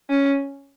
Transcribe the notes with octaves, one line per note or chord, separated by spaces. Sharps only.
C#4